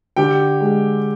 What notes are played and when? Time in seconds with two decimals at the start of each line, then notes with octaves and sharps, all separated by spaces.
0.16 D3 G4 G5
0.61 G#3